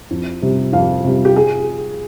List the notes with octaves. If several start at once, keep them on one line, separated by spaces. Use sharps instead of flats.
F2
C3 G3
F2 F5
C3 G3
G4
G#4